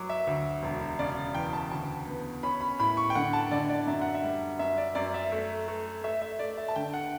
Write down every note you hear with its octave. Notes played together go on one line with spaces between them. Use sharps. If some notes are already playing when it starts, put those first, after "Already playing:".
Already playing: F#2 F#3 D6
E5
D2
E1
C#3 D5
E2 G5
A5
D2 A5
B3
C#4 B5
B5
A2 B5
C#6
G5
D3 F#5
A5
D3 D5
D5
F#2 E5
F#5
E5
G3
F#2 E5
D5
F#2 D5
E5
A3
A3
A3 E5
E5
A3 D5
E5
A5
D3 G5
F#5